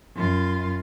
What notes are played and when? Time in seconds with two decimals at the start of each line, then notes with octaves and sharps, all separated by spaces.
0.15 F#2 F4